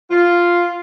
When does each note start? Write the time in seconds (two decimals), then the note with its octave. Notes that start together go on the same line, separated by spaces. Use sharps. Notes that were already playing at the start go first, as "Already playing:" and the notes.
0.11 F4